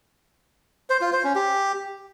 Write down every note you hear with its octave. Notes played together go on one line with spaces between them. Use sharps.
C5
F4
C5
C#4
G4